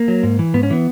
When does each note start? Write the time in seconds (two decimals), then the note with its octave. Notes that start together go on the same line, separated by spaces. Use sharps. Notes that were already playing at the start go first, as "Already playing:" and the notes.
Already playing: A#3
0.08 F#3
0.23 G#2
0.39 E3
0.54 G#2 B3
0.63 C#4
0.70 E3 B3